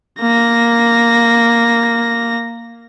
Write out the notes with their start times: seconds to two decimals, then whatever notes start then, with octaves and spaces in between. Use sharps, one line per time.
0.21 A#3 A#6